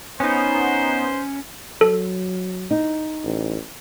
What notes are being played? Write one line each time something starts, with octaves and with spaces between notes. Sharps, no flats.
B3 C#4 D#4 C5
F#3 A4
D#4
A1